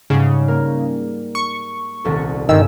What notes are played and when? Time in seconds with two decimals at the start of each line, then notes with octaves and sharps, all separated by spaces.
0.10 G#2 C#3 G3
0.48 A#3 A#4
1.35 C#6
2.04 D#1 C2 A4
2.49 G1 G2 D#3 G#4 E6